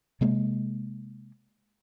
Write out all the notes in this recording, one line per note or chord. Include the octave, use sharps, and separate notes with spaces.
C3 G#3 A#3